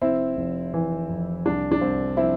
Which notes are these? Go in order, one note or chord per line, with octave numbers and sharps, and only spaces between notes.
F1 C4 E4
F1
E3
F2
C2 D4
D4
C2 C4
F3 C4 E4